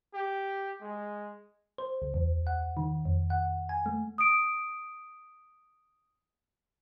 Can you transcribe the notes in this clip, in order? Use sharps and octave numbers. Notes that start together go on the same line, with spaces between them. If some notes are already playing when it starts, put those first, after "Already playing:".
G4
G#3
C5
C#2
E2
F#5
D#3
F2
F#5
G#5
A3
D#6 D7